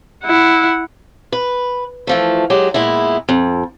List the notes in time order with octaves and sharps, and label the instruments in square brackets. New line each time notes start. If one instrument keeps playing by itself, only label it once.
[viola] E4 F#5
[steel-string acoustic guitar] B4
E3 F3 A3
F#3 G#3 G4
A#2 G#3 B3 E4
F2